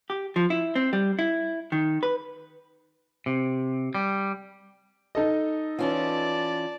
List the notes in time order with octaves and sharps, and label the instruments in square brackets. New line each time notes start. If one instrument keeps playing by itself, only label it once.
[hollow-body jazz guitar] G4
F3
E4
C4
G3
E4
D#3
B4
[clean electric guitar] C3
G3
[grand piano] D#4 A4 D#5
[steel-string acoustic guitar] E3 C#4 F4 [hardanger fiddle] D5 A5